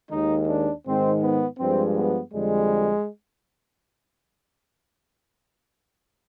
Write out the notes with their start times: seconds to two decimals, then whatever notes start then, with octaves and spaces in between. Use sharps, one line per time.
0.11 D#2 D#3 G#3 D#4
0.48 D4
0.85 G#2 D#3 G#3 C4
1.23 B3
1.59 G2 F3 G#3 C4
1.96 B3
2.33 F2 D3 G3 G#3